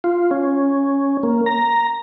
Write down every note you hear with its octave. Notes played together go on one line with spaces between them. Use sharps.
F4
C#4
A#3
A#5